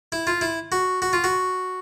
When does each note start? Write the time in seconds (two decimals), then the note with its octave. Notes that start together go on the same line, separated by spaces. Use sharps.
0.12 E4
0.27 F4
0.41 E4
0.72 F#4
1.02 F#4
1.13 F4
1.24 F#4